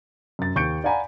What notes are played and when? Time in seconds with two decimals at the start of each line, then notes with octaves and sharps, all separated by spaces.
0.39 F#2 A6
0.56 D#2 C#6 G6 C#7 D7
0.84 D5 F5 F#5 G#5 A#5 B5